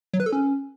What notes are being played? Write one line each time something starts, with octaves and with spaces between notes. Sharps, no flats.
F#3
B4
A4
C#4